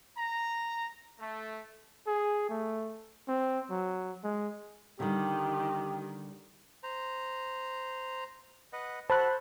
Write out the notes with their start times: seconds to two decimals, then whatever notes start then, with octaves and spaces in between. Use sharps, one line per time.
0.17 A#5
1.19 A3
2.07 G#4
2.49 A3
3.28 C4
3.70 F#3
4.24 G#3
5.00 D3 D#3 G3 G4
6.83 C5 A#5
8.73 B4 D#5 F#5
9.10 F#4 A4 C5 F#5 A5 B5 F#6